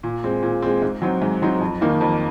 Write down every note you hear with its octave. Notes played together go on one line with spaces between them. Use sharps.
A#2
G#3 C4
A#2
G#3 C4
G#2
F#3 C4 D#4
G#2
F#3 C4 D#4
F2
D#3 A#3 D#4
F2